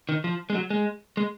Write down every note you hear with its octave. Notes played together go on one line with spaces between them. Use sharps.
D#3
F3
G#3
F#3
G#3
G#3